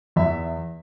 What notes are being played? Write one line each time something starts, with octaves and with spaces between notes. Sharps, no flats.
E2 E5